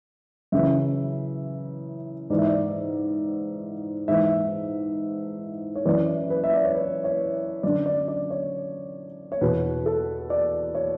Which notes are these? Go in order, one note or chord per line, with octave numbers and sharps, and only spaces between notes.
F#2 C#3 E3 E5
G#2 E3 D5
E5
D5
G#2 E3 E5
E5
C#5
F#2 E3 D5
B4
E5
D5
C#5
B4
C#5
F#2 D3 D5
D5
D5
C#5
C#5
E2 B2 B4
A4
D5
C#5